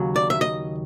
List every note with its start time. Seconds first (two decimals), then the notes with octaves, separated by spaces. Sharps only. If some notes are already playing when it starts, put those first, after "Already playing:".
Already playing: D#2 C#3 F#3
0.16 D5
0.30 E5
0.41 D#5